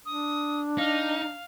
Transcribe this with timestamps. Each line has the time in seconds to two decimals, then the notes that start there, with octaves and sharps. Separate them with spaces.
0.06 D4 D#6
0.78 D#4 F5